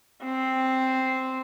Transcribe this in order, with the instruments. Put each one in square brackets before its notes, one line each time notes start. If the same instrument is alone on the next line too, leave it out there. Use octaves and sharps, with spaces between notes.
[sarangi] C4